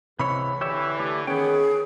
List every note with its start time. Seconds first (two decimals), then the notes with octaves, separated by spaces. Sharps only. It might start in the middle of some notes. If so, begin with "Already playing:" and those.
0.19 C#2 C3 E3 C#5 B5
0.61 D3 E3 G4 C#5 E5
0.99 A3 G4
1.27 D#3 A#3 B3 C#4 G#4 C#5 G5